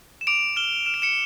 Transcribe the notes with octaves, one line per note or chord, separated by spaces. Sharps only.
E7
D6 D7 F7
F6 E7 G7
F6 E7
D7
C#7 E7